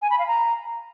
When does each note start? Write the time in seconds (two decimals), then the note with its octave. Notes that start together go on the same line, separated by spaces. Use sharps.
0.02 G#5
0.10 B5
0.19 F5
0.27 A#5